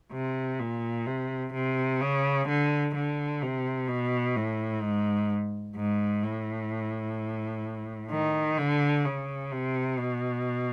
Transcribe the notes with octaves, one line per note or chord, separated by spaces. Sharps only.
C3
A#2
C3
C3
C#3
D3
D3
C3
B2
A2
G#2
G#2
A2
D#3
D3
C#3
C3
B2